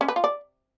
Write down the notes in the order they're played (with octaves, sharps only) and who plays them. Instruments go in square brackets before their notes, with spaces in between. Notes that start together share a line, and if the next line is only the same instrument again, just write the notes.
[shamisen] C#4
B4
F4
D5